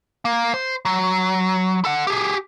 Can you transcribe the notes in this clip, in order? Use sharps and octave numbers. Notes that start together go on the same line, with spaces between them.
A#3
C5
F#3
A4 F#5
G4 G#4